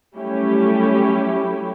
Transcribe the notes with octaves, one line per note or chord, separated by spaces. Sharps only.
F#3 G3 A3 C#4 E4 G4